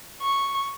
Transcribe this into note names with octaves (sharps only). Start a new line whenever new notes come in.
C#6